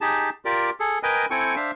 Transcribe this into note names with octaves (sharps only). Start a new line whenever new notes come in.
D#4 G4 G#4 A5
F4 G4 A#4 D5
G#4 A4
A#4 B4 D#5 G5 G#5
C4 E4 A4 G5 G#5 C#6
D4 C5 E5 F5